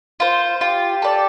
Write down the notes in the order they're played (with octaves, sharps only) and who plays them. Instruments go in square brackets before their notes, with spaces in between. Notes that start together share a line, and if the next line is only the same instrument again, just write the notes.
[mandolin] F4 C5
[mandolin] F4 [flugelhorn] G4
[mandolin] A4 D5